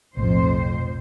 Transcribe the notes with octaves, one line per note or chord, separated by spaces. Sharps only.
B1 F2 A2 C5